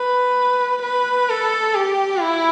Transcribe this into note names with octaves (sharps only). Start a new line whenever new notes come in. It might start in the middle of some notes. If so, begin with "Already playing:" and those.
Already playing: B4
B4
A4
G4
E4